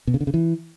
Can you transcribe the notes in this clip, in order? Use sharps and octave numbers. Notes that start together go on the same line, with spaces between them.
B2
C#3
D3
C#3
E3